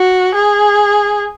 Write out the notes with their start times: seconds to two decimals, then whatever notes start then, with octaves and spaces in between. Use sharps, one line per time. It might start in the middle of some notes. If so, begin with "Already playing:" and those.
Already playing: F#4
0.34 G#4